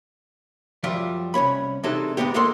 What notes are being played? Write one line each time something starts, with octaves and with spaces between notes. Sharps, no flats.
F#2 F3 G3 F4 D5 E5
C2 F2 C#4 B5
C3 E3 G#3 D4 D#4 A4
G#2 D3 G#3 B3 G4
E2 G#3 A#3 A4 C6